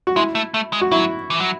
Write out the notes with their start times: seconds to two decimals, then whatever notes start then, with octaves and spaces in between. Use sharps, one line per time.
0.07 F#4
0.16 G#3 E4
0.35 A3
0.54 A3
0.73 G#3
0.81 F#4
0.92 F#3 E4
1.30 E3
1.40 F#3